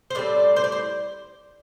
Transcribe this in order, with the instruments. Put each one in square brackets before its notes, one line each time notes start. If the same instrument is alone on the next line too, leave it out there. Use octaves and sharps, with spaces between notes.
[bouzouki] C5
A2 G3 C4 D5
C5
D5
C5